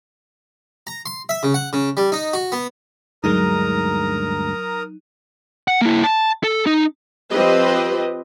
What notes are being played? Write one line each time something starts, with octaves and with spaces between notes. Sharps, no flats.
A#5
C6
E5
C#3
F#5
C#3
G3
D#4
F#4
B3
D2 G2 F#3 G#3 D#4 A#4 A#5 D#6
F#5
A#3 E4
A5
A4
D#4
F3 C4 G4 B4 D#5